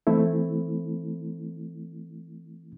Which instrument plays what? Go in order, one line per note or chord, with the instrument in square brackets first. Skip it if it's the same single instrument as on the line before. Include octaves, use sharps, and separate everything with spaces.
[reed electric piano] E3 A3 C4 E4